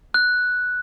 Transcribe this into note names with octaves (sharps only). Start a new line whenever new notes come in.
F#6